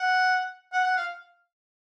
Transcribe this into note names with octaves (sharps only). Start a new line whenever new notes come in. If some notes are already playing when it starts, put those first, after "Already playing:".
Already playing: F#5
F#5
F#5
F5